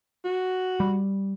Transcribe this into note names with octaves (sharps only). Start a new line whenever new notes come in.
F#4
G3